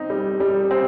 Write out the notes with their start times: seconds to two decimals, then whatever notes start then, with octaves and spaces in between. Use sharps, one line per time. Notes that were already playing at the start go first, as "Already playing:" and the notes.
Already playing: C4 D#4
0.10 G3
0.40 G3
0.71 C4